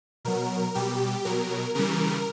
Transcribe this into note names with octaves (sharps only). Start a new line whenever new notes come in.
B2 F#3 A#4
B2 G3 G4
B2 F#3 A#4
C#3 E3 G3 A#4